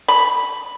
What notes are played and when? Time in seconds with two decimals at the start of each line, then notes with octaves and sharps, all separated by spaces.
0.08 B5